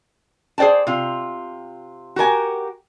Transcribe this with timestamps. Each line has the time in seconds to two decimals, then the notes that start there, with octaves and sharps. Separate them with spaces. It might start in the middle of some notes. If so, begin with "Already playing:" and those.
0.58 G#4 C5 D5 G5 A5
0.87 C3 F4
2.16 F#4 G4 A#4 G#5